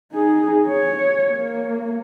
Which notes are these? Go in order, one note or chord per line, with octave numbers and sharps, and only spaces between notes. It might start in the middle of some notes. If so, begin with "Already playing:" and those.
D#4 G#4
C#5
A#3